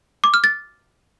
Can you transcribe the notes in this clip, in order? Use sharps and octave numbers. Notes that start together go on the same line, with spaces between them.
D6
F6
A6